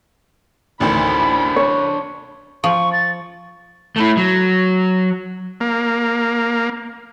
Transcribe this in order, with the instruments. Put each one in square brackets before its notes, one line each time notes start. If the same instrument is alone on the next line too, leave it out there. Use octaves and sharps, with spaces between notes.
[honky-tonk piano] A1 D2 D#3 [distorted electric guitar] D4 C5 [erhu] B5
[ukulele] C#5
[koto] F3 [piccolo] C#6
[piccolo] A6
[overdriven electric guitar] A3 E4
F#3
[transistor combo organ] A#3